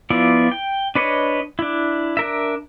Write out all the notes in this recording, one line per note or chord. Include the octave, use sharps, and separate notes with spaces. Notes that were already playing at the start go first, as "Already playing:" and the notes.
F3 B3 E4 F4 D5
G5
D4 B4 C#5 D#5
D4 E4
D4 A#4 E5